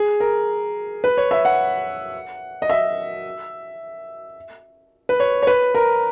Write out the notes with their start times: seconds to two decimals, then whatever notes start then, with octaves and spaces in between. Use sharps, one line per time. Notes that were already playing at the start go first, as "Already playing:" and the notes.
Already playing: G#4
0.20 A#4
1.04 B4
1.17 C#5
1.31 E5
1.45 F#5
2.62 D#5
2.70 E5
5.09 B4
5.20 C#5
5.42 C#5
5.47 B4
5.75 A#4